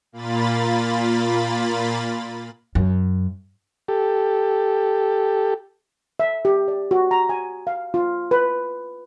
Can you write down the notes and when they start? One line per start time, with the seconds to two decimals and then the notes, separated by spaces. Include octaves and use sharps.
0.12 A#2 A#3 F4 B5 A6
2.75 F#2
3.88 G4 A4
6.20 E5
6.45 G4
6.68 D5
6.91 F#4
7.11 A#5
7.29 G#5
7.67 F5
7.94 F4
8.31 B4